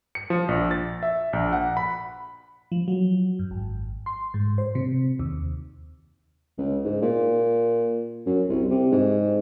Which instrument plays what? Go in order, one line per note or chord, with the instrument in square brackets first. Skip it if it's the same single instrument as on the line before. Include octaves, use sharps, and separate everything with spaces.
[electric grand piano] C#7
F3
A#1
A6
E5
A#1
F#5
B5
[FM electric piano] F3
F#3
F#2
G#1
C6
G#2
C5
C3
D#2
[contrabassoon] C#2
G#2
A#2
F#2
C2
C3
G#2